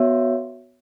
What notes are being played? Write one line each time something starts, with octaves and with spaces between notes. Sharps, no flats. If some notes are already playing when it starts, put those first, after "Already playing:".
Already playing: B3 F#4 C#5 E5